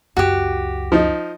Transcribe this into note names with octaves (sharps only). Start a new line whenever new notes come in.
C#2 F#2 F#4 G4
F3 D#4